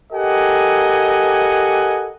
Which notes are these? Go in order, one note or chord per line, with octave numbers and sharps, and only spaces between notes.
G4 A4 A#4 D#5 F#5 G#5